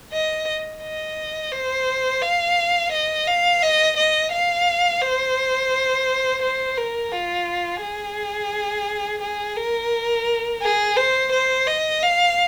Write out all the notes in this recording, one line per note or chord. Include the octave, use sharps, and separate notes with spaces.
D#5
D#5
C5
F5
D#5
F5
D#5
D#5
F5
C5
C5
A#4
F4
G#4
G#4
A#4
G#4
C5
C5
D#5
F5